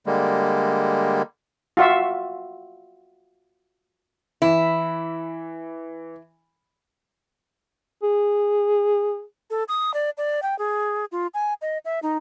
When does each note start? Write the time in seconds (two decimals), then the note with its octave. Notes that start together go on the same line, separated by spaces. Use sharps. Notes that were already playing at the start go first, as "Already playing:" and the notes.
0.06 D3 G3 G#3 A#3
1.77 F4 F#4 E5
4.42 E3 E4
8.03 G#4
9.50 A4
9.68 D#6
9.94 D5
10.17 D5
10.42 G5
10.59 G#4
11.12 F4
11.34 G#5
11.62 D#5
11.85 E5
12.03 D#4